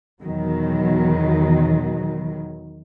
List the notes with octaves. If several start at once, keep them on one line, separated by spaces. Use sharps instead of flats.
E2 B2 D#3 F#3